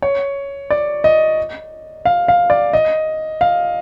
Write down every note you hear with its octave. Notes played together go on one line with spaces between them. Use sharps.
C#5
D5
D#5
F5
F5
D5
D#5
F5